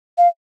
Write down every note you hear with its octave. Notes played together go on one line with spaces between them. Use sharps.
F5